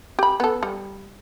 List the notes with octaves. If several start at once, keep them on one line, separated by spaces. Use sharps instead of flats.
G4 B5
B3 A4
G3